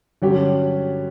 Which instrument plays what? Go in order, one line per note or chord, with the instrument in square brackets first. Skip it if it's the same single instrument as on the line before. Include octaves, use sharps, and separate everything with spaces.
[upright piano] G2 D3 F#3 C#4 G4